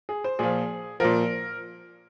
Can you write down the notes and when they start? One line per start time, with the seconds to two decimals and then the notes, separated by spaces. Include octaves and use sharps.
0.09 G#4
0.24 C5
0.39 A#2 F3 G#4
1.00 A#2 F3 A#4